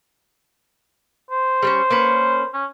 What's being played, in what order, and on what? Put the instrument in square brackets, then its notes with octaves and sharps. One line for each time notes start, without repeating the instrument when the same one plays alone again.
[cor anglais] C5
[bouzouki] G3 C4 C#4
A#3 C#4 B4
[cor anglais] C#4